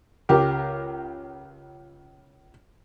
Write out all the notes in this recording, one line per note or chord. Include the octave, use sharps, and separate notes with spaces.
C#2 G4 A#4